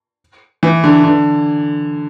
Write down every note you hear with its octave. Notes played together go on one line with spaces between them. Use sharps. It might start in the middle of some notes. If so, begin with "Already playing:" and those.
E3
D3
D3